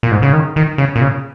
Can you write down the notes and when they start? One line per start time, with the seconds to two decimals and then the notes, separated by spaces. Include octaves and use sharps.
0.03 A#2
0.11 G#2
0.22 C#3
0.33 D#3
0.56 D#3
0.78 C#3
0.96 A#2
1.01 C#3